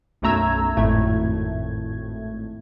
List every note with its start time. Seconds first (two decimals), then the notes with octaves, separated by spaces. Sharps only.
0.22 B1 F#2 A3 A#5 E6 G#6
0.76 G#1 F2 A2 A3 G#6